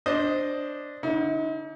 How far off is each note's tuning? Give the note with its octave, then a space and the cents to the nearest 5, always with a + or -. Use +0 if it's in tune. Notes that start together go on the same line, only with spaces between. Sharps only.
D4 +0 C5 +5 D#5 +0
D3 +0 D#4 +45